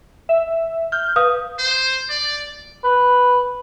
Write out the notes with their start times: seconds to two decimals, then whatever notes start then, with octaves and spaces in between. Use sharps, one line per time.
0.29 E5
0.92 F6 G6
1.16 B4 F5 D#6
1.59 C5
2.10 D5
2.84 B4